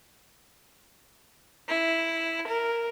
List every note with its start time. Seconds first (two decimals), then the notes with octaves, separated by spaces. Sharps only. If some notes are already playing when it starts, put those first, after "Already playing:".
1.67 E4
2.48 A#4